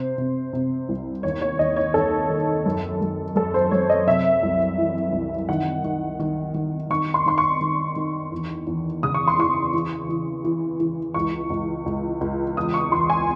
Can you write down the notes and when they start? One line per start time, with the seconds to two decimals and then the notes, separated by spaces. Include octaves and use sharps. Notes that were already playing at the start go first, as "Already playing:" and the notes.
Already playing: C3 C5
0.18 C3
0.53 C3
0.89 C2
1.23 D#2 C#5
1.41 C#5
1.59 D#2 D#5
1.76 C#5
1.94 D#2 A4
2.30 D#3
2.66 F#2
3.01 F#2
3.36 F#2 A4
3.54 C5
3.71 F#2 C#5
3.90 D#5
4.07 C3 E5
4.43 C2
4.78 E3
5.13 C2
5.49 D#3 F#5
5.84 D#3
6.19 D#3
6.54 D#3
6.90 D#3 C#6
7.14 C6
7.26 D#3 C6
7.38 C#6
7.61 D#3
7.96 D#3
8.32 E2
8.67 E2
9.03 C#3 D#6
9.14 C#6
9.28 C6
9.38 E3 C#6
9.73 E3
10.09 E3
10.44 E3
10.80 E3
11.14 C#2 C#6
11.50 C#2
11.86 C#2
12.21 C#2
12.57 E2 D#6
12.74 C#6
12.92 E2 C6
13.10 G#5